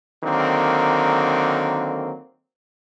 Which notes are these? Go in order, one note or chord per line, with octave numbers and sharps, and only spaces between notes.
D3 D#3 F#3 A#3 C4